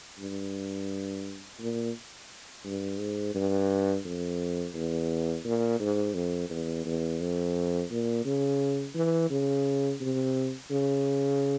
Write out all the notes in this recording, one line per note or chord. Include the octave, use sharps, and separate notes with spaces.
G2
A#2
G2
G#2
G2
F2
E2
A#2
G#2
F2
E2
E2
F2
A#2
C#3
E3
C#3
C3
C#3